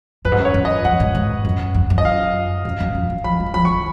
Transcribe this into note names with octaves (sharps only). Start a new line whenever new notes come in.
F#2 B4
G#2
F#2
C#5
F#2
D#5
F2 F#5
G#2
G#2
F#2
F#2
F#2
D#5
F5
F#2
F#2
F2
F#2
F3 B5
F#3
F3 B5
C#6
D#3